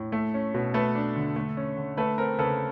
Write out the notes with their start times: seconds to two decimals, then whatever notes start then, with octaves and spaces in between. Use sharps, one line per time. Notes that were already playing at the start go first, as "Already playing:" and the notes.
Already playing: A2
0.12 A3
0.34 C#4
0.55 B2
0.74 A3 A4 B4
0.95 D4
1.16 D3
1.36 A3
1.57 C#4
1.77 D3
1.97 A3 A4 B4
2.18 C4 A#4
2.38 C#3 A4 B4